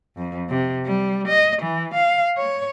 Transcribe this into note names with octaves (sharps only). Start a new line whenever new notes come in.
F2
C3
G3
D#5
E3
F5
C#5